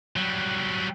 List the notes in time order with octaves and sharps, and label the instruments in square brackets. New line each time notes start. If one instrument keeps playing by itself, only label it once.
[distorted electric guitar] F#3 G3